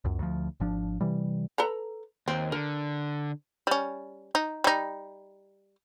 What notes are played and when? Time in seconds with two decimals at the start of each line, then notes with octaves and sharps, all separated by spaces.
0.04 C#2 F#2
0.19 D2 F3
0.60 G#1 F3 D4
1.01 C3 E3 G3
1.58 A4 B4 A#5
2.28 D#2 C4
2.52 D3 A#4
3.67 G3 C#4
4.35 D#4
4.64 G3 D#4